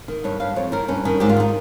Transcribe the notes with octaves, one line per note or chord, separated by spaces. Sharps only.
D#3
G2 C#5
G2 F5
F2 C#5
D#3 A#4
G2 C#4
D#3 C#4
G#2 G4
F4
D#3 D#4